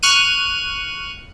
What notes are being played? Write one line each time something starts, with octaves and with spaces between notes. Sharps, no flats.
C#6 F6 F#6 D#7